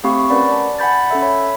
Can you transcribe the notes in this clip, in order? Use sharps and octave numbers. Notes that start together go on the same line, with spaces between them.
A3 C4 G4 F5 B5 C#6
C#4 A#4 B4 D5 F#5 B5
D5 A5
F#5 G#5 B5 G6 A6
C#4 A4 E5
C#5 B5